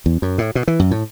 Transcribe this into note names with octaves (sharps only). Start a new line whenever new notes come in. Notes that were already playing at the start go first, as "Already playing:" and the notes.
E2
F#2
A2
B2
E3
F#2
A2